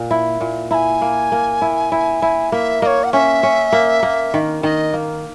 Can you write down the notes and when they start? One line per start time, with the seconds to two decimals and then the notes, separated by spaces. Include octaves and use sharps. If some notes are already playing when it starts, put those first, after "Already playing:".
Already playing: A#2
0.11 E4
0.41 A#2
0.71 E4 A#5
0.74 G#5
1.02 A#3
1.32 A#3
1.62 E4
1.92 E4
2.22 E4
2.52 A#3 E5
2.82 A#3 C#5 D#5
3.04 F#5
3.12 C#4 E5
3.43 C#4
3.72 A#3
4.03 A#3
4.34 D#3
4.63 D#3 D#5
4.93 A#3